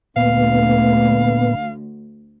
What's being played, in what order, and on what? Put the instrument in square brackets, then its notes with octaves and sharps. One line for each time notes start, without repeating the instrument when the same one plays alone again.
[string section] D2 [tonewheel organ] A#2 B3 [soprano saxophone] F5